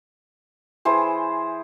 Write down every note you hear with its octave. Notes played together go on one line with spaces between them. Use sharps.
E3 G#4 C5